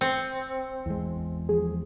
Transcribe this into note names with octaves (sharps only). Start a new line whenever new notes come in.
C4 C#7
G#1 E2 G#3
F3 G#4